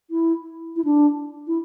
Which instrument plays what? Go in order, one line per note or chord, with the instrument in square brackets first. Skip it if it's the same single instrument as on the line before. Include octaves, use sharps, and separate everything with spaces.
[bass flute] E4
E4
D4
E4